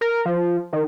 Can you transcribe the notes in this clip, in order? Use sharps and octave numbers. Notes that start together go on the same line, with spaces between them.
A#4
F3
D#3